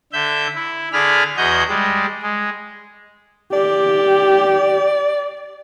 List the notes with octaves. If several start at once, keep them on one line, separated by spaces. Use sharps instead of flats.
D3 E5 G6
E4
D3 G#4 D5 B5 F6
E2 F#4 G#4 D#5 G6
G3 G#3
G#3
G4 D5